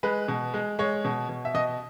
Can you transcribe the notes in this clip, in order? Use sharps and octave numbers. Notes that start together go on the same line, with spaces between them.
G#3 B4
B2
G#3
G#3 C#5
B2
B2
E5
B2 D#5